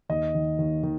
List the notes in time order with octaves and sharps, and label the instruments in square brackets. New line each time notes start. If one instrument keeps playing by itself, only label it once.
[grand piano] D#2 D#5
D#3
D#2
D#3